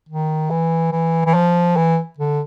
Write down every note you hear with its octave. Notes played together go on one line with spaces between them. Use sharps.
D#3
E3
E3
E3
F3
E3
D3